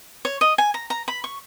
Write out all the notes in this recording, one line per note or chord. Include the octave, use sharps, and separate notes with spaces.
C#5
D#5
G#5
A#5
A#5
B5
C#6